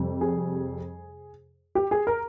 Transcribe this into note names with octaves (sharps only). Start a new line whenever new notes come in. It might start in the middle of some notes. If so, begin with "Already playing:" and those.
Already playing: F2 C3 G3
G#4
G4
G#4
A#4